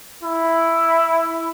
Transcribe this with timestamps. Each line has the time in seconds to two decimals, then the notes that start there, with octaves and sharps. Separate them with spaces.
0.23 E4